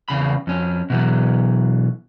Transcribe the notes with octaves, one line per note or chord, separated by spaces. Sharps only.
E2 C#3 B5
F2 C#4
B2 E3 F#3